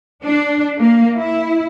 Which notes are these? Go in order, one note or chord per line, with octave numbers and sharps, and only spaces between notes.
D4
A#3
E4